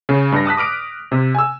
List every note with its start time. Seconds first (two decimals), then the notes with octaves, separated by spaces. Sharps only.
0.09 C#3
0.32 G2 A#6
0.45 A5 D#6 F#6 B6
0.57 D6 D#6 F6 D7
1.12 C3
1.35 G#5 E6